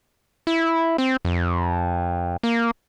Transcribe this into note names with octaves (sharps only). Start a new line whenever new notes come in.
E4
C4
F2
A#3